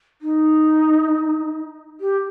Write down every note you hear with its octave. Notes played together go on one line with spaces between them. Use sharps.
D#4
G4